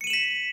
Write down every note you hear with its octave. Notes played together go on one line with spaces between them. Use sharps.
B6 C#7 D#7 E7 F#7